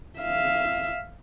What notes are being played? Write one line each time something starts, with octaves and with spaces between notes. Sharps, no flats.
E5 F5